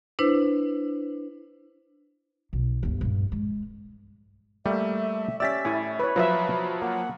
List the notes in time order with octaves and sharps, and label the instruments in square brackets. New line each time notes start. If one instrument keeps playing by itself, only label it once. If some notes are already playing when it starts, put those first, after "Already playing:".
[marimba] D4 E4 B4 C5
[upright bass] B1
G1 D2
G2 A#2
G#3
[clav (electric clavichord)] G3 A#3 [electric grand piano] A3 [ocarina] E5
[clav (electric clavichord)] C#4 G4 D5 [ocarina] E5 [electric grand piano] E6 A6 B6
[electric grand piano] A2 [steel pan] E4 G#5
[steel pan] B4 C#5 [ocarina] B5
[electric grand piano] F3 F#3 [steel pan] F4 B4 E5
[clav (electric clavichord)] A#3 [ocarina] F#5